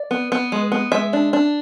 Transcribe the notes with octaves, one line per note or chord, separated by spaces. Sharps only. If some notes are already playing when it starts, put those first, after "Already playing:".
Already playing: D5
B3
B3
G#3
B3
G#3 E5
D4
D4